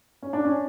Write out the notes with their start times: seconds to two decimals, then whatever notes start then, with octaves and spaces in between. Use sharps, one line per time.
0.22 C#4
0.33 D4
0.45 C#4